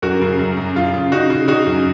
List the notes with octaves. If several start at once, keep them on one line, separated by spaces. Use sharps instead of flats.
F#2 F#4 A#4
C#3
F#2
F#2
C#3 F4
C#3
C#3 D#4 F#4
C#3
C#3 D#4 F#4
F#2